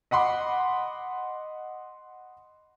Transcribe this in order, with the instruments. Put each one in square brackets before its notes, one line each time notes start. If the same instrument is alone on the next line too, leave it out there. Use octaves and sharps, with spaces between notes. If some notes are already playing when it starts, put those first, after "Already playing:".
[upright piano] D#5 F#5 B5 C6 D6